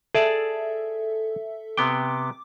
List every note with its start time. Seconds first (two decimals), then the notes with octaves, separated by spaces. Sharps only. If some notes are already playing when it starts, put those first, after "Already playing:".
0.15 G#4 A4 D5 E5 A5
1.77 C3 B3 G5 D6